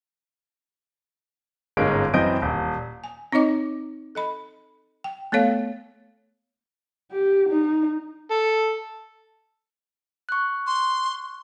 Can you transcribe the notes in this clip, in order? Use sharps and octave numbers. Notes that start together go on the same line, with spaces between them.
G1 G#2 G#3 A#3 C#4 D7
F#2 E3 C4 D#5 G6 D7
D#1
G#5
C4 D#4 C#5 D#5 D6
A4 D#5 B5
G5
A3 B3 A4 C#5 F5
G4
D#4
A4
C#6 F#6
C6